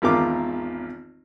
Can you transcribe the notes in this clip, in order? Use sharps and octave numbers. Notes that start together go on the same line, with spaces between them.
G#1 E2 F4 A#4 D6